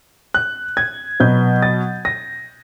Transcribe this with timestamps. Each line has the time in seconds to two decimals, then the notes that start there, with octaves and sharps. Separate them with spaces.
0.34 F#6
0.77 G#6
1.20 B2 F#3 B3 G6
1.62 A6
2.05 A#6